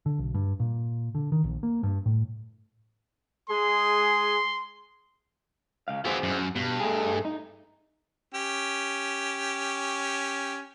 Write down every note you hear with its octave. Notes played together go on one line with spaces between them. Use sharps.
D3
B1
G2
A#2
D3
D#3
A#1
A#3
G2
A2
G#3 G#4 C6
C#2 F5
E3 B3 F#4 G#4 C5
F#2
G2 B2
A3 G#4
D#4
C#4 G4